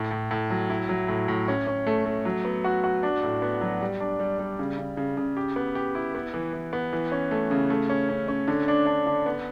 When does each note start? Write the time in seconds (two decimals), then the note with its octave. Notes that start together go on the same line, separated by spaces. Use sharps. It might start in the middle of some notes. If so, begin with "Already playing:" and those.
Already playing: A2
0.11 A2
0.31 A2
0.50 F#3
0.70 E4
0.89 F#3
1.08 A2
1.28 A2
1.48 C#4
1.67 C#4
1.87 A3
2.05 A3
2.25 F#3
2.45 B3
2.64 F#4
2.84 F#4
3.03 D4
3.23 A2
3.42 B3
3.61 F#3
3.81 G3
4.00 D4
4.20 G3
4.39 G3
4.59 C#3
4.78 C#3
4.97 C#3
5.17 C#3
5.37 G4
5.56 B3
5.75 G4
5.95 E4
6.15 B3
6.34 E3
6.53 E3
6.73 B3
6.93 E3
7.12 C#4
7.31 A3
7.51 C#3
7.70 A3
7.89 C#4
8.09 C#4
8.28 C#4
8.48 D3
8.68 D4
8.86 D4
9.06 D3
9.26 B3